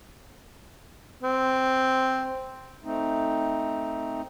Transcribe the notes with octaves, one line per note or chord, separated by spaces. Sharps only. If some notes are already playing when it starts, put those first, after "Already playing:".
C4
A3 C4 D#4